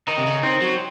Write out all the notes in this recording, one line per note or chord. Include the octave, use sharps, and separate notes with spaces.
D#3 D#4
C3
C#3
D#3 C4
F#3